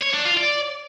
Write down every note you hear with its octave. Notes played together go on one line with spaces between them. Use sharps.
C#5
D4
F4
D5